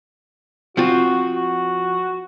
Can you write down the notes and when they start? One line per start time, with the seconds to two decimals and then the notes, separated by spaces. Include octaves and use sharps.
0.77 F3 C4 F4 F#4
1.35 F#4